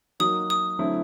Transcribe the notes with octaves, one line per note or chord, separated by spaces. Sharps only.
F#3 A#3 D#4 F#4 A#4 D#6
D#6
D3 F#3 A3 C4 E4